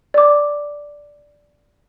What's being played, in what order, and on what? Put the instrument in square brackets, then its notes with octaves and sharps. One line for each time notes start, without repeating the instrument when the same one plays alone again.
[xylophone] D5 D6